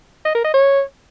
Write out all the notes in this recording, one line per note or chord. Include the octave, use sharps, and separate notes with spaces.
D#5
A#4
D#5
C#5